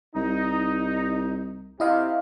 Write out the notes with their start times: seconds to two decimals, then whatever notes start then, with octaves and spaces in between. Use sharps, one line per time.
0.15 C2 D#4
1.80 C3 E4 D#5 F5